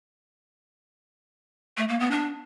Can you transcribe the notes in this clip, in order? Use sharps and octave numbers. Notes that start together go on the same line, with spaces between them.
A3
A#3
B3
D4